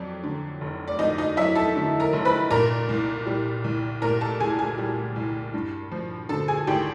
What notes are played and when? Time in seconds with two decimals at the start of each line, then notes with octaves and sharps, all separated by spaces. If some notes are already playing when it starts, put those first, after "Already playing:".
Already playing: F2 F#3 D5
0.24 D3
0.61 F1
0.88 D5
0.99 F2 D#4 D#5
1.18 D#4 D#5
1.37 F#3 E4 E5
1.55 A4 A5
1.76 D3
2.00 A#4 A#5
2.13 F1
2.25 B4 B5
2.51 A#2 A#4 A#5
2.89 C2
3.27 G3
3.64 C2
4.02 A#2 A#4 A#5
4.21 A4 A5
4.40 C2 G#4 G#5
4.59 G#4 G#5
4.78 G3
5.16 C2
5.54 G2
5.92 F3
6.29 D3 A4 A5
6.48 G#4 G#5
6.67 G#1 G4 G5